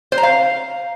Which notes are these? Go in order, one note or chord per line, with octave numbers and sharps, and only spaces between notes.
C5
A#5
F5